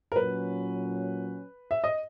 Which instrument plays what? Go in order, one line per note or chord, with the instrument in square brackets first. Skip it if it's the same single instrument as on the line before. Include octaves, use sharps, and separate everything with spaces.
[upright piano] A#4
[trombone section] A#2 F#3 C#4 [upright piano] B4
[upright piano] E5
D#5